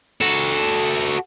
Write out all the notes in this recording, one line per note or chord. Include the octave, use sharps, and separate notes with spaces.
F#4 A4